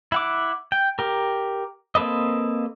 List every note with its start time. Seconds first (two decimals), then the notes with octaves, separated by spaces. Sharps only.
0.12 E4 F#5 D6
0.72 G5
0.99 G4 A#4
1.95 A#3 C4 A4 B4 D#5